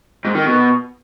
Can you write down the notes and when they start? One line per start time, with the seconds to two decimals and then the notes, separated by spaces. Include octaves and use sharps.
0.25 G#2
0.35 D#3
0.45 B2